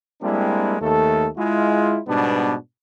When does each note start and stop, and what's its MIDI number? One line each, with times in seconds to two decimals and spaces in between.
0.22 0.76 55
0.22 0.76 56
0.22 0.76 58
0.22 0.76 60
0.22 0.76 62
0.22 0.76 64
0.82 1.27 39
0.82 1.27 57
0.82 1.27 69
1.38 1.99 56
1.38 1.99 64
1.38 1.99 65
2.07 2.55 44
2.07 2.55 47
2.07 2.55 55
2.07 2.55 59
2.07 2.55 62